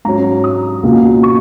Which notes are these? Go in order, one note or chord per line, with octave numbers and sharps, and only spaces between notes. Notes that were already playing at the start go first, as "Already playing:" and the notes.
G#2 F#3 C#4 A#5
D#6
C#2 B2 A#3
C#6